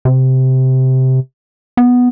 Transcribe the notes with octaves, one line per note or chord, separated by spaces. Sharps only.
C3
B3